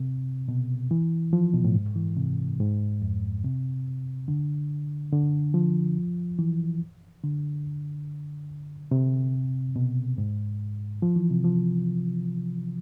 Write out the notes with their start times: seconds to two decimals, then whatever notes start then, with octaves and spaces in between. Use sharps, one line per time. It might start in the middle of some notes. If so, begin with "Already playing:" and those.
Already playing: C3
0.49 B2
0.91 E3
1.33 F3
1.54 B2
1.64 A2
1.75 G#2
1.96 E3
2.17 C3
2.60 G#2
3.02 F2
3.44 C3
4.28 D3
5.13 D3
5.54 F3
6.39 E3
7.23 D3
8.91 C3
9.76 B2
10.18 G#2
11.02 F3
11.16 E3
11.31 C3
11.44 F3